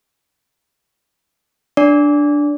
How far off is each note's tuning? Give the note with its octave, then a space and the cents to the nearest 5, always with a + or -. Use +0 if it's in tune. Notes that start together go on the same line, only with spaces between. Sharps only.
D4 +0 D5 -20